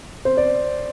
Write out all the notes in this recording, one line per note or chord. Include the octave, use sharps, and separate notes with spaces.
C5
D5